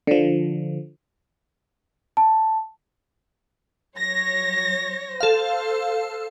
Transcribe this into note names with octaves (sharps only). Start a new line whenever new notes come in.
D3 F3
A5
F#3 C#5 A#6
A4 C5 F5